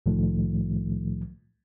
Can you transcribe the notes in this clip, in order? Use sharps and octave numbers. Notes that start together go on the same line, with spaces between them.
C2 A2 D#3 F3 A3